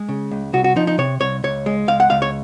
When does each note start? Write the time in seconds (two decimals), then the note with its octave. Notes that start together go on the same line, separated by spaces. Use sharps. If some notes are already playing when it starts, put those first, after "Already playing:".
Already playing: G#3
0.09 C#3
0.31 C#2
0.53 C2 F#4
0.64 F#4
0.76 F3 D#4
0.87 D#4
0.98 C3 C#5
1.20 C2 C#5
1.44 C#2 C#5
1.66 G#3
1.88 C#2 F5
2.00 F#5
2.10 C#2 F5
2.22 C#5